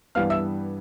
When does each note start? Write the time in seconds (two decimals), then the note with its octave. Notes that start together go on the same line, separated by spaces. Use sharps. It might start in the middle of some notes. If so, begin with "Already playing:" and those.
0.15 G2 E3 G3 B3 F5 F6
0.30 E5 E6